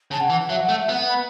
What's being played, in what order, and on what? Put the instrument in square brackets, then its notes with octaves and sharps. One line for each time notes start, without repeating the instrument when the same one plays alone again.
[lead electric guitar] C#3 [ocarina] A5
[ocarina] F#5
[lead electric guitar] E3
[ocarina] F#5
[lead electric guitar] F#3 [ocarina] E5
[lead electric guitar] A3 [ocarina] F#5
[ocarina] E5
[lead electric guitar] B3 [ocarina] F#5
[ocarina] B5